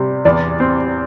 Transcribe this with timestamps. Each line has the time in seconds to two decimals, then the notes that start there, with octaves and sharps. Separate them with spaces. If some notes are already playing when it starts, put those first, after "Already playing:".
Already playing: C3 G3
0.25 E2 D5
0.60 C4